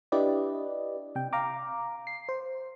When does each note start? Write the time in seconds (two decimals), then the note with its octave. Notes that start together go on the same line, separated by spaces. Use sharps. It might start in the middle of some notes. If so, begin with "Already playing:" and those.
0.12 D4 E4 G4 B4 D5 D#5
1.15 C3 G5
1.33 F5 A#5 D6
2.07 C7
2.29 C5